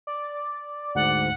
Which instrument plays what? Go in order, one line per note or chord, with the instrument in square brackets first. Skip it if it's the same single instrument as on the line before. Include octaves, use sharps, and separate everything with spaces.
[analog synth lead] D5
[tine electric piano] D2 G#2 [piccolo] F#5